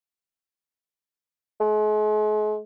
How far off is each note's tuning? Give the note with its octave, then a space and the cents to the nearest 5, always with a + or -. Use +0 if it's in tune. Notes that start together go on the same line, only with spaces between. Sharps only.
G#3 +40